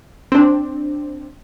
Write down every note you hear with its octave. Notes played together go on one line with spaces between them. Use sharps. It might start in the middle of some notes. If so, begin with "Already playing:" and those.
C4 D4